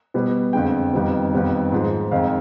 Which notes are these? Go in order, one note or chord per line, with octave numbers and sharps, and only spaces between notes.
B2 G3 B3
F2 D3 G#3 G5
F2 D#3 G3 B3
F2 D#3 G3 B3
G#2 F3 G#3
F2 D#3 G#3 F5